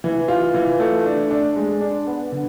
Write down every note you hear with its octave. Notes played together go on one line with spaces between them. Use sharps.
E3
F4
E3
A3
D4
D4
G#3
D4
B3
D3